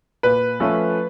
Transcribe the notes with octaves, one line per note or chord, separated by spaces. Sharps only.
A#2 B4
F3 A3 C#4